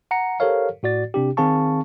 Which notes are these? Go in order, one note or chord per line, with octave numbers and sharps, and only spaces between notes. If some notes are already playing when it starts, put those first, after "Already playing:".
F#5 A#5 C#7
G4 A4 A#4 C5 C#5 F5
A2 F#4 D5 A6
C3 D4 G4
D#3 C4 G#4 F5 A5 C#6